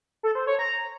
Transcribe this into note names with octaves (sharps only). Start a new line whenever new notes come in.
A4
C5
C#5
A#5